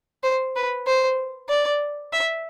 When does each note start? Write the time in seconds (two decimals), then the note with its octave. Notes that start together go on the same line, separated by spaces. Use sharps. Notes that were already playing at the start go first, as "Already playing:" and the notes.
0.23 C5
0.56 B4
0.87 C5
1.49 D5
2.13 E5